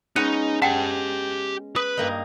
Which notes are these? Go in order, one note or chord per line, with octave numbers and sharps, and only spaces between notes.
G#3 B3 C#4 D#4 F#6 C#7 D#7
G4 F#5 G5 A5
B4 D#6
G2 A#3 D#4